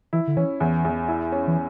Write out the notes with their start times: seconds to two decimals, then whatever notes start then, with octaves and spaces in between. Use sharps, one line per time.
0.13 E3 E4
0.28 D3
0.37 E3 C#4
0.60 E2 E3
0.85 E2
1.08 E4
1.32 C#4
1.47 E3